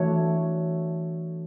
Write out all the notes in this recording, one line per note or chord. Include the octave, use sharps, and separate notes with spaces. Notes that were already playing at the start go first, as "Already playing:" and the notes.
Already playing: E3 A3 D4 F#4 C#5